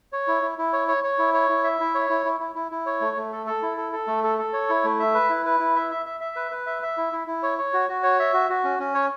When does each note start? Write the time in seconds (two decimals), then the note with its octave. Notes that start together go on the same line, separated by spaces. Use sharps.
0.12 C#5
0.28 E4
0.42 E4
0.58 E4
0.73 C#5
0.88 C#5
1.04 C#5
1.19 E4
1.34 C#5
1.49 E4
1.64 E5
1.80 E4
1.95 C#5
2.10 E4
2.25 E4
2.40 E4
2.55 E4
2.71 E4
2.86 C#5
3.01 A3
3.17 A3
3.32 A4
3.47 A4
3.62 E4
3.77 A4
3.93 A4
4.07 A3
4.24 A4
4.38 A4
4.53 C#5
4.70 E4
4.84 A3
5.00 E5
5.15 B4
5.30 E4
5.46 B4
5.60 E4
5.76 E5
5.91 E5
6.06 E5
6.21 E5
6.36 B4
6.51 B4
6.66 E5
6.82 E5
6.97 E4
7.13 E4
7.27 E4
7.43 C#5
7.58 C#5
7.73 F#4
7.89 F#4
8.03 C#5
8.20 E5
8.34 F#4
8.50 F#4
8.64 C#4
8.79 C#4
8.94 C#5